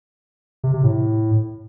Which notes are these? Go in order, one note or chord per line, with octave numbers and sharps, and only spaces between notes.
C3
C3
A2